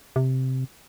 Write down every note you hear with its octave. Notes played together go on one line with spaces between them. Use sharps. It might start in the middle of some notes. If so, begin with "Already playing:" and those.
C3